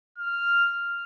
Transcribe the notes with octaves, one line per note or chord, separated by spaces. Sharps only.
F6